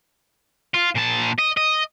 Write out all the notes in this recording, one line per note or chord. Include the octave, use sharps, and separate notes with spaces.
F4
A#2 A5
D#5
D#5